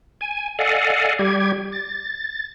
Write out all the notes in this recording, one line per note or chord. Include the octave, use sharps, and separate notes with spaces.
G#5
A4 D5 D#5 F5 F#5 G#5
G3 G4 G#6
A6